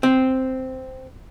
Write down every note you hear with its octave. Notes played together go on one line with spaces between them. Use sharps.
C4